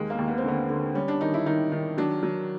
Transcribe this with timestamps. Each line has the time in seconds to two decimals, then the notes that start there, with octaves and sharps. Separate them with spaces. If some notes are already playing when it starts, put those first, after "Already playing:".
Already playing: D#2 G#3
0.10 A#3
0.19 D#2
0.28 B3
0.38 C4
0.44 D3 B3
0.69 D3
0.95 G3 C#4
1.08 D4
1.21 D#3 D#4
1.34 E4
1.46 D#3 D#4
1.72 D#3
1.98 F#3 D4
2.23 F#3